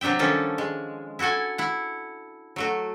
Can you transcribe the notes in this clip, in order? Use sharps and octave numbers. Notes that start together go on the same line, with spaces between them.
C3 F#3 D4 E5 G5
D#3 F3 G3 C#4 D4 A4
G#3
E4 F#4 A4 F#5 G#5
E4 F#5
F#3 A3 F#4